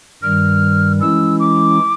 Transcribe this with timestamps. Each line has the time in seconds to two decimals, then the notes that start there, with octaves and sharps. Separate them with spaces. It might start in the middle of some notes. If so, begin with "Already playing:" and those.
0.22 G2 D#3 G3 F6
1.01 E3 G#3 C#4 E4 E6
1.40 D6